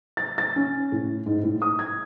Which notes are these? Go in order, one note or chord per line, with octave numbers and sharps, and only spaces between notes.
A6
A6
C#4
A2
G#2
A2
D#6
G#6